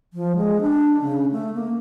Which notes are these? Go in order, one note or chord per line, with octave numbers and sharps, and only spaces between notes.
F3
G#3
D4
C#3
A3
A#3